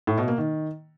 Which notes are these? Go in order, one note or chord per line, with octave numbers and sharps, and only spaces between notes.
A2
B2
A#3
D#3